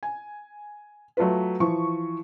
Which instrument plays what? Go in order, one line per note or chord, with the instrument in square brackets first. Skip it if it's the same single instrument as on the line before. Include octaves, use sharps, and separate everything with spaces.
[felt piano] G#5
F#3 A3 F4 B4
E3 F3 C#6